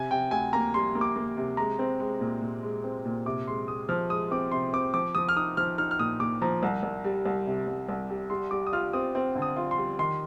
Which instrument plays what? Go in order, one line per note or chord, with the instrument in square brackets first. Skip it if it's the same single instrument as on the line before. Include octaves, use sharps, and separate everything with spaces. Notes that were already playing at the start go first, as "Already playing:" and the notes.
Already playing: [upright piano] C3 [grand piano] G#5
[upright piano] C3 [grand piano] G5
[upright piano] D2 [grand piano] G#5
[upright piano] A#3 [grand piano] A#5
[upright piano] G3 [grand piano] C6
[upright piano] A#3
[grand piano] D6
[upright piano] A#3
C3
[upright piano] G#3 [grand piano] A#5
[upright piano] C4
G#3
A#2
A#2
G#3
C4
A#2
[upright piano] C3 [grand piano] D6
[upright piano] G#3 [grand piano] C6
[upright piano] G#3 [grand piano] D#6
[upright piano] F3 [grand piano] F6
[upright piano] G#3 [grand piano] D#6
[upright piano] C4 [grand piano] D6
[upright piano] C3 [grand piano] C6
[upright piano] C4 [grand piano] D6
[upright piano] F3 [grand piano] D6
[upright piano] F3 [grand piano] D#6
[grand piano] F6
[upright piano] D#4 [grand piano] D#6
[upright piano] F3 [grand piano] F6
[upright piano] D#4 [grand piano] F6
[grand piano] F6
[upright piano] A#2 [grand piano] D#6
[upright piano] A#2 [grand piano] D6
[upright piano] F3 [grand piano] A#5
[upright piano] C2
C2
G3
C2
C3
C2
C2
G3
[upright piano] G3 [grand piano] C6
[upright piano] G3 [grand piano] D6
[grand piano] D#6
[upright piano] F4 [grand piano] F6
[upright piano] C4 [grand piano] D#6
[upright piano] C4
D3
[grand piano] D#6
[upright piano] F4
[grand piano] C6
[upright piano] G3
[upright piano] D#3 [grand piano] C6